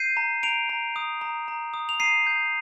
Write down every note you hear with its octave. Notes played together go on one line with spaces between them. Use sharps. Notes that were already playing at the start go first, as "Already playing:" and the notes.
Already playing: G6 C7 D#7
A#5
A#5 D7 F7
A#5
D#6
A#5
A#5
D#6
F7
A#5 C7 D#7
G6